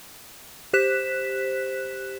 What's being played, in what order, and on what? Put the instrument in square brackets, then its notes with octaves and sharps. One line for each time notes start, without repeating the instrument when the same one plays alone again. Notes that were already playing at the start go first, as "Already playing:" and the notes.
[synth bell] G4 C5 F#6 B6 E7